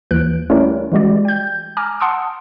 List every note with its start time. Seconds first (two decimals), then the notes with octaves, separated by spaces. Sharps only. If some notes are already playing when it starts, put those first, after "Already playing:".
0.11 D#2 E3 F#6 D7
0.50 G3 A3 C#4 E4 A#4 C#5
0.92 E3 G3 G#3 F#4 D5
1.25 G5 G6
1.77 G#5 A#5 D6 F6
2.00 F#5 A5 C6 D#6 E6 D7